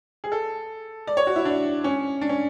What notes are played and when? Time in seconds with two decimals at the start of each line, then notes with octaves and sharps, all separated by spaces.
0.24 G#4
0.32 A4
1.07 D5
1.17 C#5
1.27 F#4
1.36 E4
1.45 D4
1.84 C#4
2.21 D4
2.29 C#4